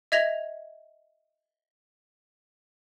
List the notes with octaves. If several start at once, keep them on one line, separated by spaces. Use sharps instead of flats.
D#5 E5 G#6 A#6 F7